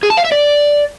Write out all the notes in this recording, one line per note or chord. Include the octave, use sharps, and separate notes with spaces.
G#4
A5
F5
E5
D5